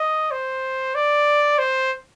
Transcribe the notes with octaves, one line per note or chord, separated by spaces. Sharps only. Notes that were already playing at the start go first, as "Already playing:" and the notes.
Already playing: D#5
C5
D5
C5